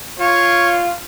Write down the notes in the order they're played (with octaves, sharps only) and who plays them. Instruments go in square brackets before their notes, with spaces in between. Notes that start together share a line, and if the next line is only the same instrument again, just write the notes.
[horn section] F4 [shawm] C#5